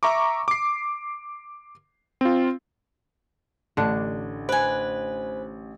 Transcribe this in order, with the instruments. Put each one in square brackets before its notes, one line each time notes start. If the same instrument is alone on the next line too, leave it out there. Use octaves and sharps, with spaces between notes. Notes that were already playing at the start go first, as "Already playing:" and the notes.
[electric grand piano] E5 A#5 C#6 D6
D6 C7
C4 F4
[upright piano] A1 [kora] D3 D4
[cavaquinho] B4 G#5 [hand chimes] C5